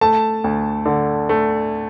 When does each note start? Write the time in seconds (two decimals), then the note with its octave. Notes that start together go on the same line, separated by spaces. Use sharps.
0.01 A3 A5
0.44 D2
0.86 D3
1.29 A3